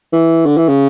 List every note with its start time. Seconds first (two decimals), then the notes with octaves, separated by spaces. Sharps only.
0.13 E3
0.46 D3
0.57 E3
0.69 C#3